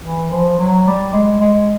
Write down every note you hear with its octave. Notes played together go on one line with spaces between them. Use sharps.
E3
F3
F#3
G3
G#3
G#3